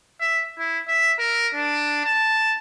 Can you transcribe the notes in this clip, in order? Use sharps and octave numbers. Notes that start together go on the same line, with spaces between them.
E5
E4
E5
A#4
D4
A5